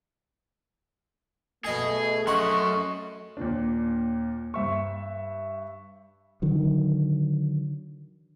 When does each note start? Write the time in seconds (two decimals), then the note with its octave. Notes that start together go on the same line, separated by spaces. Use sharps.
1.65 B2 A3 G#4 D#5 G#5
2.27 F#2 F#4 D#5 F#5 C6 C#6
3.37 D#2 A#2 D4
4.54 G2 E5 C#6
6.42 D3 D#3 F#3